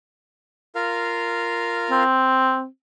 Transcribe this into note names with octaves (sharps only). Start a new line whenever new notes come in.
F4 A#4 F5
C4